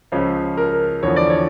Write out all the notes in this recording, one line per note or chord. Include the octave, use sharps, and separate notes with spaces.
C#2 C#3 F3 C#5
A#4
E2 D3 F3 C#5
D5
C#5